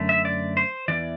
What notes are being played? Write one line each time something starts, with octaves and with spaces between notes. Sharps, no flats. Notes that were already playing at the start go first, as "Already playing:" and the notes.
Already playing: F#2 D3 A3 D4
E5
D5
C5
E2 C3 E3 D5